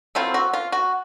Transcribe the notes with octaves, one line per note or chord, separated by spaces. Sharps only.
F#3 A3 C4 E4 F4
F#4
F4
F#4